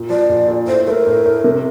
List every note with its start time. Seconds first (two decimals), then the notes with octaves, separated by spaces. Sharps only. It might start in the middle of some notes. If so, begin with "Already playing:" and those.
Already playing: A#2
0.10 F3 D5
0.29 A#2
0.48 A#2
0.67 A2 C5
0.86 A3 A#4 C5
1.07 A2
1.26 A2
1.44 C3